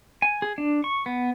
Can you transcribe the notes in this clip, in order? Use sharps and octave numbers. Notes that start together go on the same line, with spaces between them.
G#5
G#4
D4
C#6
B3